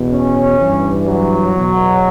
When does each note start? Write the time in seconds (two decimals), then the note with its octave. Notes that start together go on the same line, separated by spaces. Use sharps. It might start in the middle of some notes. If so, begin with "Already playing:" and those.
Already playing: E2 B2
0.11 C#4
0.58 E3
0.63 G2
1.06 F#3
1.54 E2 B2